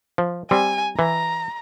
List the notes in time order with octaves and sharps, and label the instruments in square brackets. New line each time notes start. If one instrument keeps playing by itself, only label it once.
[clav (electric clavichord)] F3
[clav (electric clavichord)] G3 C4 [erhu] G#5
[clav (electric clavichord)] E3 [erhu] A#5